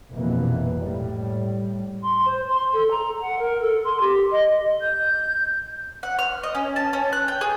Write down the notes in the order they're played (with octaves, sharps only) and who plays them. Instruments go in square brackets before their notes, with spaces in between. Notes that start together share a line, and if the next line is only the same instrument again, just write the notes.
[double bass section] F1 A#1 B2 E3 A#3
A2 G3
[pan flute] C6
C5
C6
A4
A#5
F#5
A#4
A4
C6
G4
D#5
[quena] G6
[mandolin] F#5
F6
D#5
C#4
A5
C#4
F#6
G5
G#4